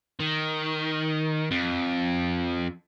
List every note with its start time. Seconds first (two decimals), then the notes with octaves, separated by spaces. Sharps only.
0.20 D#3
1.51 F2